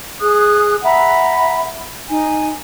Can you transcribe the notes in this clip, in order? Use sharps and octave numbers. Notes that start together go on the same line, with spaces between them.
G#4 D#6 F#6
E5 F#5 A#5 B5
D#4 G#5